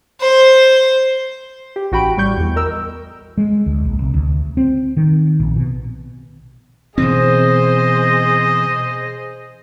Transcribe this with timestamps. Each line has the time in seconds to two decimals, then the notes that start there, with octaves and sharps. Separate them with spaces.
0.20 C5
1.76 G4
1.92 A1 F#4 G5 B5 D7
2.17 A2 G3 C#6 G6
2.38 E2 E3
2.56 A#4 D#5 E6
3.38 G#3
3.66 D2
3.85 A#1
3.99 C2
4.14 D2
4.57 C4
4.97 D#3
5.40 A#1
5.56 B2
6.98 B2 E3 C4 G#4 C5 D#5